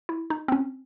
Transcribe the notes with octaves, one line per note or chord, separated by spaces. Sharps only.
E4
D#4
C4
C#4